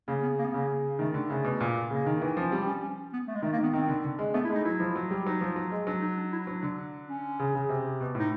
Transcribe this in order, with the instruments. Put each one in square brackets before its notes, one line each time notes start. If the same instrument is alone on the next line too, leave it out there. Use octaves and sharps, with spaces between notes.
[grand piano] C#3 [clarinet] A#3
[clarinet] B3
A#3
B3
[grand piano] C#3 [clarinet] A#3
[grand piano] D#3 [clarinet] A3
[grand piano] D3
[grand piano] C#3 [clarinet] A3
[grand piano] B2
A#2
[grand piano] C#3 [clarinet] A#3
[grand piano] D#3
E3
[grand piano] F3 [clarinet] C#4
[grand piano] G3 [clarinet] C4
[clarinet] C#4
C#4
B3
A3
G#3
[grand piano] D#3 [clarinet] A3
[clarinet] A#3
[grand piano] D#3
[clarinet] B3
[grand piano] D#3 [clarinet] C4
[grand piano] D3
D3
G#3
[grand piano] A3 [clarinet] B3
[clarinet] E4
[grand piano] G#3
[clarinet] D#4
[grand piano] F#3 [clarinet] E4
[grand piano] F3
F#3
G3
[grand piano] F#3 [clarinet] D#4
[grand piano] F3
F#3
G#3
[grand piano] F#3 [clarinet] D4
[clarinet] D#4
D4
E4
[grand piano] F#3 [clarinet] D4
[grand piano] D3
[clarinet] C#4
[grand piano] C#3
C#3
C3
B2
[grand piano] A2 [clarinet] D#4